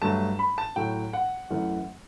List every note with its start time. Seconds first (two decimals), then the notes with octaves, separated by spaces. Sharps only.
0.02 G2 F#3 A3 A5
0.39 B5
0.58 A5
0.76 A2 F#3 A3 G5
1.13 F#5
1.50 F#2 E3 A3